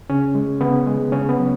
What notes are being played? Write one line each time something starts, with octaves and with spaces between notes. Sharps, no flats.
C#3 C#4
G#3
C#3 B3
G#3
C#3 C#4
B3
F#3